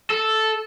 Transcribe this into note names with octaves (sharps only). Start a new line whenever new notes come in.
A4